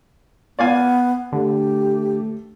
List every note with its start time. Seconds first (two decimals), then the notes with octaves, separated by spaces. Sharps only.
0.59 B3 D5 F5 G#5
1.32 D3 A3 G4